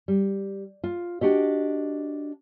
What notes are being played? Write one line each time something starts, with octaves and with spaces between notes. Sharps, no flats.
G3
F4
D4 F#4 G4 D#5